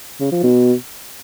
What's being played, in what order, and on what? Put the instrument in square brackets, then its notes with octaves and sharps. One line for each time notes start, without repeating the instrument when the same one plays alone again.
[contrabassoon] C#3
F3
B2